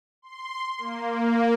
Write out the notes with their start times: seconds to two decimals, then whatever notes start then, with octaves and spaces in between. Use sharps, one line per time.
0.22 C6
0.78 A#3